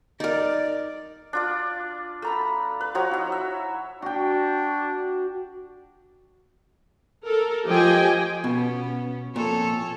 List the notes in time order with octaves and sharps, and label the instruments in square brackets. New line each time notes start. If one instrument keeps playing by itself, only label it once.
[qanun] D#4 A#4 [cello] D5
[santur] D4 F4 D5
A3 A#5 B5
B4
F3 F#4 C#5 A#5
D#4 E4
E5
[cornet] D4 [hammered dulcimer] F#4 G5
[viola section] A4 A#4
F3 G4 D#5 G5 G#5
[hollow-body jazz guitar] B2 [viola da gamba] B3 C#4
[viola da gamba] F2 A4 C#5 [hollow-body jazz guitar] A#2